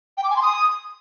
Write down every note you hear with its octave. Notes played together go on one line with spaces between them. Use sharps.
G5
D6
G#5
C6
D#6